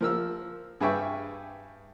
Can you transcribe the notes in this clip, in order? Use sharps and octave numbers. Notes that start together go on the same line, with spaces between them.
F3 A#4 E6
G2 G#4 B4 E5 G5 C#6